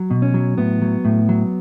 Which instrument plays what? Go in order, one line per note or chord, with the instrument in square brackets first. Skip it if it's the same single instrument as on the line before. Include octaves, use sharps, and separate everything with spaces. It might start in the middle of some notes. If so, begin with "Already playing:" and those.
Already playing: [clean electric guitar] F#3
B2
C#4
F#3
A2 B3
F#3
A2
F#3